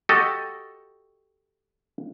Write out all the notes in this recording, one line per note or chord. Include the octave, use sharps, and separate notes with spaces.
F#4 G4 A4 D#5